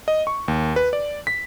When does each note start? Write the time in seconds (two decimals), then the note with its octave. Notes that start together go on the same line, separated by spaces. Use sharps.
0.08 D#5
0.27 C#6
0.48 D#2
0.76 B4
0.93 D5
1.27 B6